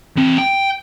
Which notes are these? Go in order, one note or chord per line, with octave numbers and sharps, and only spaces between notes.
E3 C4
G5